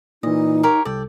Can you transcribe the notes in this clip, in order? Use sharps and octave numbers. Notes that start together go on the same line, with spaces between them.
A#2 E3 D#4 D#5
G4 A#4 C#5
C2 A4 D5 G5